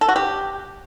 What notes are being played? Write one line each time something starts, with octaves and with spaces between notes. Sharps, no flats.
A4
F#4
G4